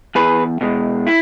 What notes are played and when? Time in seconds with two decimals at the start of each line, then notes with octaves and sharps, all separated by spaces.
0.15 E2 G#4 B4
0.61 B2 G#3
1.07 E4